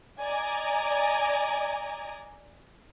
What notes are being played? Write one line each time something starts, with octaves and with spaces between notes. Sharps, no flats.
D5 D#5 G#5 A#5